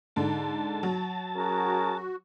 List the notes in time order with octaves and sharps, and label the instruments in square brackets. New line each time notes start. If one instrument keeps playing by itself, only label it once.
[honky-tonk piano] G#2 D3 [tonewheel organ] A5
[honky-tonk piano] F#3
[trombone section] C#4 G#4 A#4 [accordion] F#4